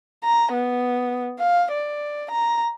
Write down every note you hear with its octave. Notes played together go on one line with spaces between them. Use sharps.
A#5
B3
F5
D5
A#5